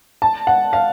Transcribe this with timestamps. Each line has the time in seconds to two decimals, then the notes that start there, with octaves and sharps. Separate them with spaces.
0.22 A5
0.47 F#5
0.73 F5